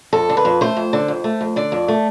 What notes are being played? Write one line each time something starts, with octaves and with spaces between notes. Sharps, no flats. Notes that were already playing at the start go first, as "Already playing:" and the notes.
F2 A4
D3
B4
F2
A3 C5
F2
D3
F2
A3
F2
D3 D5
F2
A3